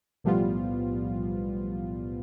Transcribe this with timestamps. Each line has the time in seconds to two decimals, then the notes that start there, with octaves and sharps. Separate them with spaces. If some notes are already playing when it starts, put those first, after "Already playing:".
0.24 B1 A2 F3 G3 B3 F4